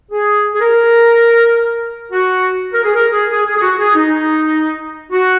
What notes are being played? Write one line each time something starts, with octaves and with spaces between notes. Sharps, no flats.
G#4
G#4
A#4
F#4
A#4
G#4
A#4
G#4
G#4
G#4
G#4
F#4
G#4
D#4
F#4